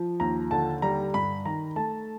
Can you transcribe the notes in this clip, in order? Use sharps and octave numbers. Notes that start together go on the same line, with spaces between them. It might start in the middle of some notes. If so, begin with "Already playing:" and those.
Already playing: F3
D#2 A#5
D3 A5
G3 A#5
G2 B5
D#3 A#5
A3 A5